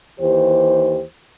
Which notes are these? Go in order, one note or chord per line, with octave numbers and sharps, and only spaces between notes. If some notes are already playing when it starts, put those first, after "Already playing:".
D#2 E3 G4 C5